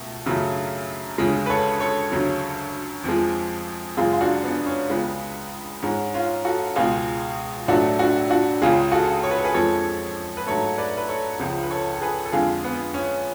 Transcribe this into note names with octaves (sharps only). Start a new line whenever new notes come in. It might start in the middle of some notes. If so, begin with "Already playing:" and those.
Already playing: C#2 B2 A3
F#2 C#3 F#3 A3
D2 C#3 G#3
B4
A4 C#5
A4 C#5
D2 C#3 F#3
F2 F3 G#3
F#2 C#3 G#3 F4 G#4
F4
D4 F#4
B3 D4
C#4
C#2 C#3 G#3 B3
G#2 G#3 C#4
C#4 F4
F#4 A4
C#2 B2 G#3 F4 G#4
A2 F#3 A3 D4 F#4
D4 F#4
D4 F#4
C#2 C#3 G#3 F4 G#4
F#4 A4
C#5
B4
A4
G#4 B4
F2 F3 G#3 A4 C#5
B4
G#2 F#3 A3 A4 C#5
B4 D5
B4
A4 C#5
C#2 C#3 F3
B4
A4 C#5
A4
G#4 B4
A4
F2 D3 G#3 F4 G#4
B3
C#4